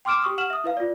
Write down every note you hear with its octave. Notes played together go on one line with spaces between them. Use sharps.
G5 C6 D6 F6 D7 E7
G4 C#6 D#6
F#5 F6 E7 F#7
E5 D#6
E4 B4 F5
F4 D5